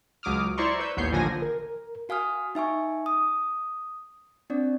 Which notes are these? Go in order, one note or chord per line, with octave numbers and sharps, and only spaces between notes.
C#2 F#3 D6 D#6 F6
E4 C5 D5 A#5 C6 C#6
B4 E6 G6
A1 D#2 B3 C#5 G6 C7
A1 A#2 D3 F3 G#5 A#6
A#4
F#4 F5 G#5 D#6 F6
D#4 E5 G#5 C#6
D#6
C4 D4 D5